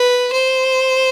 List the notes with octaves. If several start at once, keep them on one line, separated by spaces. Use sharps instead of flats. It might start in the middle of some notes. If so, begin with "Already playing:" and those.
Already playing: B4
C5